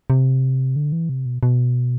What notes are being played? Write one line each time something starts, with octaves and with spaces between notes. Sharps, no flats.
C3
D3
E3
C3
B2
B2